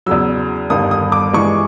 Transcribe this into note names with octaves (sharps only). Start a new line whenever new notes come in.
E2 C#3 F#3 E6
G1 G2 D#3 D#6
D#6
D6
G2 E3 G#3 C#6